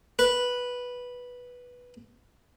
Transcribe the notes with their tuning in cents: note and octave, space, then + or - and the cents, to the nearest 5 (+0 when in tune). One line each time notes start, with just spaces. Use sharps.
B4 -5